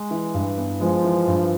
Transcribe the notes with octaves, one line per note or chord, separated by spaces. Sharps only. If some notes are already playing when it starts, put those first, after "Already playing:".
Already playing: G#3
E3
G2
B3
F3 G#3
E3
G2